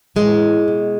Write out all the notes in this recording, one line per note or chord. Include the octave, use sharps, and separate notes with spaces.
A2 E3 G#3
B2